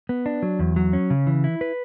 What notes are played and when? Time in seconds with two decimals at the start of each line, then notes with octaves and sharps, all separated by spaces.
0.09 B3
0.26 D4
0.43 F#3
0.59 E2
0.76 F#3
0.93 C#4
1.10 C#3
1.27 E3
1.44 E4
1.61 B4